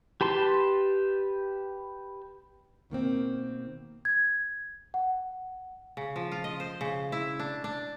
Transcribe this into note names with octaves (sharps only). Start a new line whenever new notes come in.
G4 B4 A5 C6
B2 D#3 A#3 C4
G#6
F#5
C#3
F3
F4
D#5
C5
C#3
E4
D4
D4